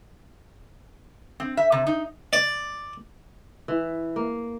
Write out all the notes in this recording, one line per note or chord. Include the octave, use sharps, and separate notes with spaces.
C4
E5
C3
D#4
D5
E3
A#3